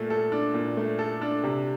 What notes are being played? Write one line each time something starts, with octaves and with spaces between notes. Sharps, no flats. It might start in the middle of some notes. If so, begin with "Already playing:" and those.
Already playing: A#2 A3
A4
D4
A#2
A3
A4
D4
C3